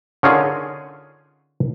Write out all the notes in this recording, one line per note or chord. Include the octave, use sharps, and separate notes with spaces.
D3 C#4 D#4 F4 G#4 A#4